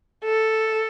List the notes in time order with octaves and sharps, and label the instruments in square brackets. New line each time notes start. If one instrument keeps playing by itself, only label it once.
[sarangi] A4